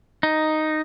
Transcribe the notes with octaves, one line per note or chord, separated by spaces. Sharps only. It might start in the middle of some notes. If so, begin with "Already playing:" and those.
D#4